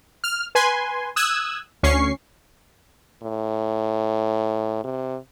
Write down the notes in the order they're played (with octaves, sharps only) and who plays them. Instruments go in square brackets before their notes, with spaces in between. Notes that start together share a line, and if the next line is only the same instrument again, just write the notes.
[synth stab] F6
B4 G#5 C6
D#6 E6 F#6 G#6
D2 C#4 C#6 C7
[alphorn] A2
C3